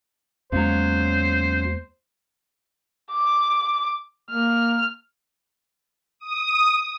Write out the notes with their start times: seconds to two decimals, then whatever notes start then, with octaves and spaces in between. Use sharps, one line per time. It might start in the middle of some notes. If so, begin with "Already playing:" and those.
0.52 E2 C#3 F#3 G#3 A#3 C5
3.12 D6
4.31 A#3 F6
6.19 D#6